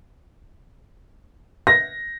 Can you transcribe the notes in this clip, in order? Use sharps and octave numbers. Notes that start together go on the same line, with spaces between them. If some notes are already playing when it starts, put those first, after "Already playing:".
A#6